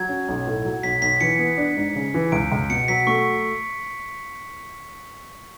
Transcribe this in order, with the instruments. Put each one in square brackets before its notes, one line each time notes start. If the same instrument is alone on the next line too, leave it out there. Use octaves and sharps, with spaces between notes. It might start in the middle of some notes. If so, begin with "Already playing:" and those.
Already playing: [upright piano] F#3 [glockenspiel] G#6
[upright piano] C#4
B1
A2
F#3
[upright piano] B1 [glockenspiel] B6
[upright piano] B1 [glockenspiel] B6
[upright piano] E3 [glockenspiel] C#7
[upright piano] B3
D4
G#2
C#3
E3
[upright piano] C#2 [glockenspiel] D7
[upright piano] C#2
[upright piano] B2 [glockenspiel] C#7
[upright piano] F#3 [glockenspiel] B6
[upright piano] A3 [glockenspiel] C#6